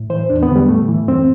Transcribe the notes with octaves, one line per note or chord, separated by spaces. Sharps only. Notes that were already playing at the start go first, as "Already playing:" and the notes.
Already playing: A2
E3 C5
E2 D4
B3
D3
G3
A2 A3
E3
F#2 C4